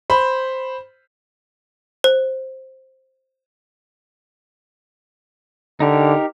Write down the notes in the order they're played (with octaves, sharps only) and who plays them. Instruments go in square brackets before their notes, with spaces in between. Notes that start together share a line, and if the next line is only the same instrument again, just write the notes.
[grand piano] C5 B5
[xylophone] C5
[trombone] D3 [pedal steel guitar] D#4 G4 A#4